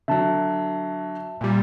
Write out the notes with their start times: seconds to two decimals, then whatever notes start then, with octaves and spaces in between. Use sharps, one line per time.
0.08 D3 F#3 E5 A5
1.41 A#2 G3